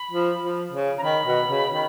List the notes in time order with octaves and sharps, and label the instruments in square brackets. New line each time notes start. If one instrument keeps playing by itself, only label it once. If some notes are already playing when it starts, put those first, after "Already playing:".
Already playing: [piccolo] B5
[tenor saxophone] F3
F3
C#3
[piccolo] A#5
[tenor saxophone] D#3 [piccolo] B5
[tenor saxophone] B2
C#3
D#3